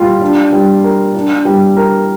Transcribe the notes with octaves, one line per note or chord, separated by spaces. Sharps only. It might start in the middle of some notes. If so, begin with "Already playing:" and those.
Already playing: G3 F4
D4
G3
A#4
D4
G3
A#4